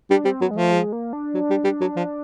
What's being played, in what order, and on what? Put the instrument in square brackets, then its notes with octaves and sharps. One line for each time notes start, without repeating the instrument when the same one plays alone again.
[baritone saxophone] G3 [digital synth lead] D4
[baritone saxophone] G3 [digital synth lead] C4
[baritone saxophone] F#3 [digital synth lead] B3
[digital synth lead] G#3
[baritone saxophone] F3 [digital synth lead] A3
[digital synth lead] G#3
A#3
D4
[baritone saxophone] F#3
G3
G3
F#3
F3